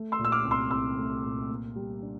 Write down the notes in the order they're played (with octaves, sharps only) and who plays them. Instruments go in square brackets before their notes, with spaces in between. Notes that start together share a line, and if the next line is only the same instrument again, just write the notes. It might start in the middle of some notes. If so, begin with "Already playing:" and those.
Already playing: [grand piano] A3
C6 E6
A#2
E6
D6 F6
C2
C6 E6
C2 C6 E6
A3
A#2
A#3
G3
D4